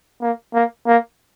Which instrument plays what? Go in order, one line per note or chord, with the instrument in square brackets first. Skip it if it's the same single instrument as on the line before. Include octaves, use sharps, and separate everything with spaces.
[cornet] A#3
A#3
A#3